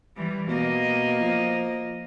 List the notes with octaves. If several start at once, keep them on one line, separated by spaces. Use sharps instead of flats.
E3 G3
B2 A#3 D#5
F3